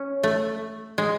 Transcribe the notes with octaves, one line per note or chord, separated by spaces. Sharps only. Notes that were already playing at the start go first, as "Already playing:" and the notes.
Already playing: C#4
A3
G#3